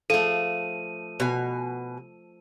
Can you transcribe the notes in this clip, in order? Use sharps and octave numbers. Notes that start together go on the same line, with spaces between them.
F3 A3 A4 D#7
B2 G#5